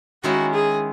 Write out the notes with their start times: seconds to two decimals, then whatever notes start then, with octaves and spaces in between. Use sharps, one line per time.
0.24 D#3 G#3 C#4 E4 F#4
0.54 G#4